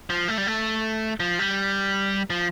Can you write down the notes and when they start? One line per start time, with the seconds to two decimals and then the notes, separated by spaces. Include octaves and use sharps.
0.10 F3
0.28 A3
0.38 G3
0.47 A3
1.20 F3
1.39 G3
2.30 F3